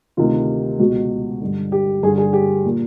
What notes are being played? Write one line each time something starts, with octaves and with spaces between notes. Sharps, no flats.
D2 C3 D#3 F4
C#2 B2 F#4
G2 D3
G4
G2 D3 G#4
G#4
G4
A#2